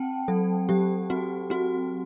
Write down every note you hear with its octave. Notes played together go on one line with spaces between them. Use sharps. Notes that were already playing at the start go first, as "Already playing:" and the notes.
Already playing: C4 F#5 G5 A5
F#3 A4
F#3 G4
C4 F#4
C4 F#4